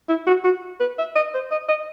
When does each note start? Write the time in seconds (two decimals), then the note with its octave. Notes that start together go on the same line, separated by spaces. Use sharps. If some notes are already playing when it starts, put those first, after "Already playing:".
0.09 E4
0.27 F#4
0.44 F#4
0.80 B4
0.98 E5
1.16 D#5
1.34 C5
1.51 D#5
1.69 D#5